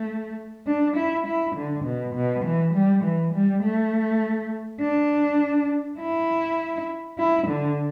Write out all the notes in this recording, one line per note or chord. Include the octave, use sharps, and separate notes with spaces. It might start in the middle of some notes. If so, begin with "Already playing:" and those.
Already playing: A3
D4
E4
E4
D3
B2
B2
E3
G3
E3
G3
A3
D4
E4
E4
D3